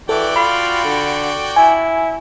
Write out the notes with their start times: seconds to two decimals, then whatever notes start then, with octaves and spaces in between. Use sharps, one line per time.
0.09 E3 F#4 A4 D5 G5
0.36 F4 B5
0.84 D3
1.56 E4 G#5